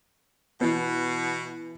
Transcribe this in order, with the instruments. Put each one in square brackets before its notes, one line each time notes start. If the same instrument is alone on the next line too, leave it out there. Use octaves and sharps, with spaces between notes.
[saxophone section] B2 [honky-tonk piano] E3 B3